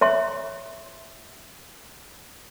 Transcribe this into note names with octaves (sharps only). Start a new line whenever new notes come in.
C#5 E5 C6